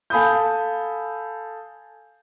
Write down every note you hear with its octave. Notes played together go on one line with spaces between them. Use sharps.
A4 F5 G#5 B5 D#6 G6